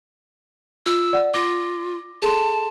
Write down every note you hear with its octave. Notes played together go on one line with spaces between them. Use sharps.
F4 E6
D5 F#5
F4 D6 A#6
G#4 A4 A5 C6